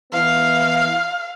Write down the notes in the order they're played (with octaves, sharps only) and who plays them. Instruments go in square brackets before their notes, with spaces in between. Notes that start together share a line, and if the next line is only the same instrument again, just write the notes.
[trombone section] E3 B3 [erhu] F5